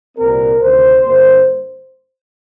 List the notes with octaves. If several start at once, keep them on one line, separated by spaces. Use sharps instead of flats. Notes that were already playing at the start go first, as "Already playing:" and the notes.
C2 A#2 G3 C4 A#4
D2 C3 D#3 C5
G2 D3 G3 A#3